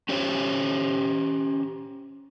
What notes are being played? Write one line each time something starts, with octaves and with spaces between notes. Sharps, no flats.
C#4 G4 C5 C#5